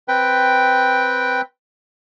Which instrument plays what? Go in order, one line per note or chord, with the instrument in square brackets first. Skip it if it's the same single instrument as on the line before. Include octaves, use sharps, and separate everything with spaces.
[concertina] C4 B4 G5